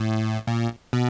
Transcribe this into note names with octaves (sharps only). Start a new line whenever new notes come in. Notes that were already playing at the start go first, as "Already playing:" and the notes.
Already playing: A2
A#2
B2